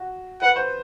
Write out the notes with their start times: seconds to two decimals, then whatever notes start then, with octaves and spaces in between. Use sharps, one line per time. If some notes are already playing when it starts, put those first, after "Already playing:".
Already playing: F#4
0.42 B4 F#5
0.56 C5